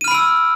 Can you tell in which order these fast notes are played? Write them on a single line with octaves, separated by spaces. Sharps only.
D#7 F6 B5 D7 E6